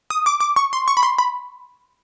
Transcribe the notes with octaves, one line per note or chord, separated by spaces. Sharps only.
D#6
D6
D6
C#6
C6
C#6
B5
C6
B5